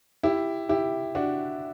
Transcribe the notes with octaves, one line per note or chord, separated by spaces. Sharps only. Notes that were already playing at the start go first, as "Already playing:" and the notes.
E4 G4
E4 G4
D4 F#4